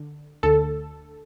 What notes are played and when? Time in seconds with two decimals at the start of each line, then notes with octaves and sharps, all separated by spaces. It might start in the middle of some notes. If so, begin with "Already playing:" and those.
Already playing: D3
0.43 D2 D3 A4